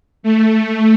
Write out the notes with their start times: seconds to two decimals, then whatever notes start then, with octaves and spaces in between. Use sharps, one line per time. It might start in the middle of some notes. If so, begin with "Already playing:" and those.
0.23 A3